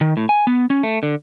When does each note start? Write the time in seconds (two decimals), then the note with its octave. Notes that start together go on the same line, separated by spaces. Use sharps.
0.01 D#3
0.17 A2
0.29 G#5
0.47 B3
0.70 C#4
0.83 A3
1.03 D3